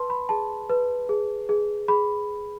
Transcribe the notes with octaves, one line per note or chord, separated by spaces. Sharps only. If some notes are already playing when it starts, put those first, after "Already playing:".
Already playing: B4 A5 C6
B5
G#4 A5
B4
G#4
G#4
G#4 B5